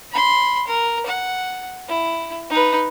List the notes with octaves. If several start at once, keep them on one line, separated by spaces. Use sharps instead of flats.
B5 C6
A#4
F#5
E4
D#4 B4